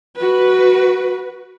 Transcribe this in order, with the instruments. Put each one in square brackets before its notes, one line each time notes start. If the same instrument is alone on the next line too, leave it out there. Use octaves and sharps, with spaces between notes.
[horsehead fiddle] F#4 B4